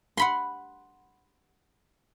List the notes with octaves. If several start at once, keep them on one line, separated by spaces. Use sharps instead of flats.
F#5 B5 C6